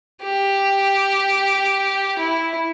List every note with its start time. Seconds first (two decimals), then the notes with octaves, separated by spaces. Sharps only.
0.24 G4
2.19 E4